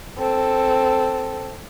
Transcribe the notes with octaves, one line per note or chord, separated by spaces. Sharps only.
C4 A4